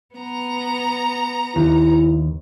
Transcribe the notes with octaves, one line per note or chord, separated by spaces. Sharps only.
B3 A#5
D#2 E4